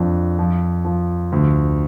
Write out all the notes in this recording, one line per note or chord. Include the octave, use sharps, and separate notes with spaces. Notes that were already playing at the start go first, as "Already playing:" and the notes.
Already playing: F2 D4
F3
F3
D2